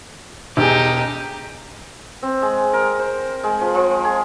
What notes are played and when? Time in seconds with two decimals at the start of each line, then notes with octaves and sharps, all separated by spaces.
0.57 E1 D#4 G4 G#4
2.23 C4
2.42 G#3
2.73 A#4
2.99 C5
3.44 G#3
3.61 F3
3.75 F3
4.05 G#4